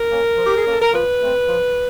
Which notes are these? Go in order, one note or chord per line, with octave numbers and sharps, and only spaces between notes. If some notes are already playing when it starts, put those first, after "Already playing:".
Already playing: A#4
A#3 C#4
F3
G4
G#4
A#3 C#4 A4
A#4
F3 B4
A3 C4
F3